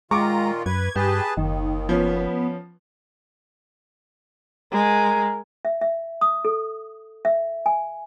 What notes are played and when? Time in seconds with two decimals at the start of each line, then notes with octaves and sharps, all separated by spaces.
0.11 A#2 D#3 G#3 F4 A#5 C#6 D6
0.66 F#2 B4 G#6
0.96 G2 G4 G#4 B4 A5
1.37 F#1 D#2 D#3
1.89 F3 B3 C#4
4.73 G#3 A#4
5.65 E5
5.81 E5
6.21 D#6
6.45 A4
7.25 E5
7.66 G#5